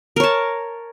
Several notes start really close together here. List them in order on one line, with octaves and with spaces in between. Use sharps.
A#4 C#5 A5